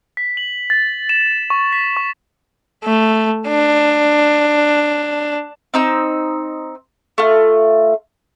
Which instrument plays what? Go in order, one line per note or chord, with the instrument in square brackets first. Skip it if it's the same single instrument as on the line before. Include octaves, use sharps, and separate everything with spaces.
[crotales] B6
F#7
A6
E7
C#6
B6
C#6
[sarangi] A3
D4
[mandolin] C4 D#4 E6
A3 F4